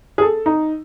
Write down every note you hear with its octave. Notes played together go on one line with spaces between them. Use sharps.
G#4
A4
D#4